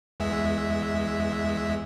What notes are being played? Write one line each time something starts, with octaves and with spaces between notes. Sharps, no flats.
E2 G#3 E5